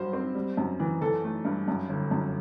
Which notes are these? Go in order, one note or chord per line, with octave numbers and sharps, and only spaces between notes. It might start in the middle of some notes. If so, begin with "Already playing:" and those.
Already playing: G2 F#3 C5
C4
G3
F#2
E3
E3 A4
A3
G2
F#2
G1
F#2